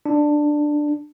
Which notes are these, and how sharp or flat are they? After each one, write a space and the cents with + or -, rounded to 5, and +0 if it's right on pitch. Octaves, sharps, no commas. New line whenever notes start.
D4 +10